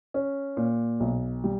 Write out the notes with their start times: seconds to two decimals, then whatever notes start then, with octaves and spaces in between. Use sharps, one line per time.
0.14 C#4
0.57 A#2
1.00 B1
1.44 G3